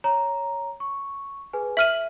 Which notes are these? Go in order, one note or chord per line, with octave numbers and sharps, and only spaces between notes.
C#5 A#5
C#6
G#4 B4 G#5
E5 F6 D#7 F#7